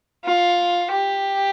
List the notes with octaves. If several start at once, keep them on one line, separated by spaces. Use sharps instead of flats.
F4
G4